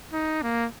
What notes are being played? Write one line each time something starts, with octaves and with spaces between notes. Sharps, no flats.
D#4
A#3